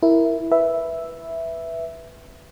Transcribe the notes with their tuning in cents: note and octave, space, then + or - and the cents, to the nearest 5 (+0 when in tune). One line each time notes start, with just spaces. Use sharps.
E4 +0 A#4 +0
B4 +0 E5 +0